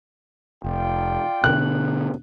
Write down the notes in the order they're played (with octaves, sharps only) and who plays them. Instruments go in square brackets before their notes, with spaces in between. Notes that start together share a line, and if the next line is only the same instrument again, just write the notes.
[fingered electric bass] F1 [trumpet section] F4 D5 G5
[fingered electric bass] B2 D3 [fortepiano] F#6